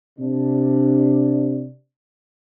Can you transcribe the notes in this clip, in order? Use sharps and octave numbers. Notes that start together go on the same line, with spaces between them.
C3 D4